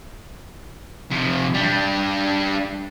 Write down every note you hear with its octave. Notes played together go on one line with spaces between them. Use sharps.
C3 F3
G3 D4